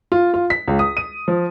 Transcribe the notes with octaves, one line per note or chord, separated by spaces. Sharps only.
F4
F4
B6
C#2
D#6
D#7
F3